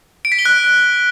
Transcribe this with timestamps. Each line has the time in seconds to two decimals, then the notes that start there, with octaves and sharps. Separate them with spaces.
0.25 D7
0.32 B6
0.39 G7
0.46 F#6